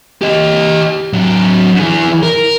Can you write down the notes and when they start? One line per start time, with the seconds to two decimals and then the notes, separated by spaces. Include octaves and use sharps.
0.22 G4 D#5
1.13 F#3 D4
1.80 E3 G#4
2.23 A#4